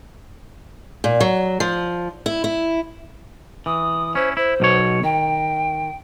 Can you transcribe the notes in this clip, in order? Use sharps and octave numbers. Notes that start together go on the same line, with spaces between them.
A#2
F#3
F3
E4
E4
E3 D#6
C#4 E4 C5
E4 C5
B1 B2 C#5
D#3 G5